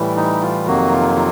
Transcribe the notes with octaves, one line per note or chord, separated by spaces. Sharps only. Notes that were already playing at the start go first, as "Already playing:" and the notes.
Already playing: A2 E3 G3
D#4
F4
F2 C3 D#3 F#3 A#3 F#4
F4
F4